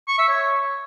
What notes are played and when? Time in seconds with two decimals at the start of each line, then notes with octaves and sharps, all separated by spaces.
0.08 C#6
0.18 E5
0.29 C#5